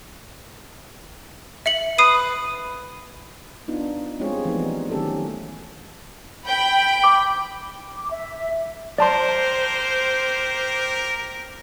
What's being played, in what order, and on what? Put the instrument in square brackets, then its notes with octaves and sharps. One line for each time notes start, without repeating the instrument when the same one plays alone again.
[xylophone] E5 C#7 F#7
[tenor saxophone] B4 [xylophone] D#6 C7 D#7
[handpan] B3 D4 D#4 F4
G3 G#3 C4 F4 G#4 C#5
E3 F3 G3 A3 B3 D#4
D#3 F#3 A3 C#4 G4 A4
[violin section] G5 B5
[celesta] D6
[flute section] D6
E5
[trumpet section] G4 A#4 [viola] C5 [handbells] D5 A5 C6